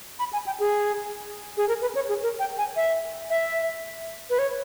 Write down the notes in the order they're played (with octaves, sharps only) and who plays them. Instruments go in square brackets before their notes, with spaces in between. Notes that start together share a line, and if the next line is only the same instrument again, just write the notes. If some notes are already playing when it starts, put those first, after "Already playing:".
[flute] B5
G#5
G5
G#4
G#4
A#4
B4
C#5
G#4
A#4
G5
G#5
E5
E5
B4
C#5